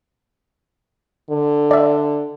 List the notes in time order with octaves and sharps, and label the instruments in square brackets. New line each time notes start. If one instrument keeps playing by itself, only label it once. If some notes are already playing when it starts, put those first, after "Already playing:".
[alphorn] D3
[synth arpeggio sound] D5 E5